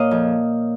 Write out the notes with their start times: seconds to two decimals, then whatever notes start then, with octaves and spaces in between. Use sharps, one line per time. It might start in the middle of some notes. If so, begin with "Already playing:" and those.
Already playing: A#2 C#5 D#5 F5
0.11 F2